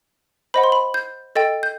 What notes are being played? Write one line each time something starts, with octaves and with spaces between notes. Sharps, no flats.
C5 D#5 F#5 B5
C6
B5
G6
A4 D#5 G5 A6
G6